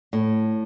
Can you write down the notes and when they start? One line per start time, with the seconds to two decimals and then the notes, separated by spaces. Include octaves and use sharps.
0.13 A2